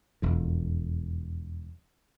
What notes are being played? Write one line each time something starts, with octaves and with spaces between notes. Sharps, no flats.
E1 F2